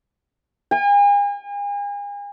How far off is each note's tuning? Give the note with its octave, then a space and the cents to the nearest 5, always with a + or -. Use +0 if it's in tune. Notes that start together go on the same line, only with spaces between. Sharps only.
G#5 -40